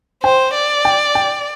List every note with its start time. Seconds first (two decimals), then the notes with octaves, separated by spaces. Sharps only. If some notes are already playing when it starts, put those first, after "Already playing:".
0.24 C5 G5
0.55 D5
0.85 G5
1.15 G5